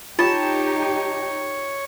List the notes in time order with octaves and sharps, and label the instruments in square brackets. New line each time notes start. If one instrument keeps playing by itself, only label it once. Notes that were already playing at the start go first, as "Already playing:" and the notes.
[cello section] D#4 G4 [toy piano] F4 [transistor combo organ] C#5 [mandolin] A5